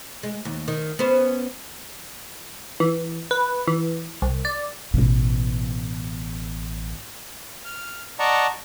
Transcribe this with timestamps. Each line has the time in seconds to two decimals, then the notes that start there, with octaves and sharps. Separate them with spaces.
0.23 G#3
0.45 D#2
0.68 D#3
0.99 B3 C#4 C5
2.80 E3
3.31 B4
3.67 E3
4.22 C2
4.45 D5
4.94 A1 B2
7.65 F6
8.19 D5 D#5 F#5 A5 A#5 C#6